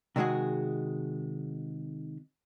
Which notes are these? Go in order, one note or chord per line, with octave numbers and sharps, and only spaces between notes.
C3 D#3 G#3 F#4 G#4